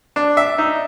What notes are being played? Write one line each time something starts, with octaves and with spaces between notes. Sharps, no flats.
D4
E5
D#4